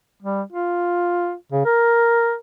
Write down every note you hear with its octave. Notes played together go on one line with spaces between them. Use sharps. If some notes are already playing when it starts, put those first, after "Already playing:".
G3
F4
C#3
A#4